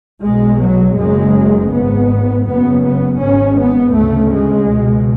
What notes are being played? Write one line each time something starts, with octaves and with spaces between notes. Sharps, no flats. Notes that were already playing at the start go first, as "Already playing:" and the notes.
B1 B2 G#3
F#3
F#1 F#2 C#3 G#3
G#1 G#2 B3
F#1 F#2 C#3 B3
B3
G#1 G#2 C#4
B3
D2 C#3 A3
G#3
C#2 B2